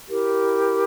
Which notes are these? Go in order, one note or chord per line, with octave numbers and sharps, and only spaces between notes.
E4 G4 A#4